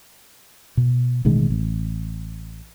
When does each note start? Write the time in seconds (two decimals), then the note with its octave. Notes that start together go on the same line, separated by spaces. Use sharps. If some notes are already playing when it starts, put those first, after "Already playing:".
0.77 B2
1.25 A1 B2 D#3 G#3
1.50 A1